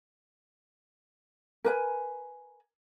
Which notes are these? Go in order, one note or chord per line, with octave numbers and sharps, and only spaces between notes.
A#4 B4 G#5